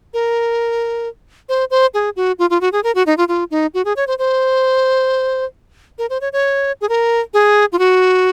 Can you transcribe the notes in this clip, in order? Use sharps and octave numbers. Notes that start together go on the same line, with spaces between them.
A#4
C5
C5
G#4
F#4
F4
F4
F#4
G#4
A#4
F#4
D#4
F4
F4
D#4
F#4
G#4
C#5
C5
C5
A#4
C5
C#5
C#5
G#4
A#4
G#4
F4
F#4